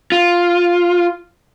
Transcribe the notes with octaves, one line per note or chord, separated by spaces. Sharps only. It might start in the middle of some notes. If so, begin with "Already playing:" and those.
F4